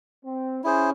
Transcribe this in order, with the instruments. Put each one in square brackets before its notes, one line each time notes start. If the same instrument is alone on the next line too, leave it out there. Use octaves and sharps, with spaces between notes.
[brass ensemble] C4
[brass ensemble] C#4 [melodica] E4 G#4 C5